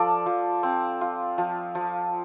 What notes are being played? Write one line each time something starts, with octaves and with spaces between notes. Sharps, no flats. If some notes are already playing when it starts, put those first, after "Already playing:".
Already playing: F3 F4 A4 D5
F3
C4
F4
F3
F3